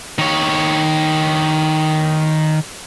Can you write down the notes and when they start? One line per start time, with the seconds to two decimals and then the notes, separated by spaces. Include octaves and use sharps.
0.19 D#3 C#5